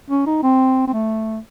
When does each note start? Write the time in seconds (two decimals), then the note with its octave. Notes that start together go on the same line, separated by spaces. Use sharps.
0.10 C#4
0.26 D#4
0.43 C4
0.87 C4
0.93 A3